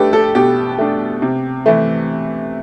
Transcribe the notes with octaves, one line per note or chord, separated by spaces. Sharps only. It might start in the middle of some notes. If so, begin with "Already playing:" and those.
Already playing: A3 D4 G4 A4 B4
A4
B2 G4
A3 D4
C3
E3 A3